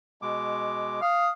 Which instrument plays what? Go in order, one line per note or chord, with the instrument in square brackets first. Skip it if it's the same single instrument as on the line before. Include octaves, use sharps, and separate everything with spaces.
[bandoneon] B2 G#3 D6
[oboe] F5 [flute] D#6